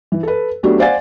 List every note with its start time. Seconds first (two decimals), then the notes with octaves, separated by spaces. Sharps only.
0.12 E3
0.23 A4 B4
0.63 F#3 A3 B3 D4 F#4 G4
0.79 C5 D5 F5 F#5 G#5 A6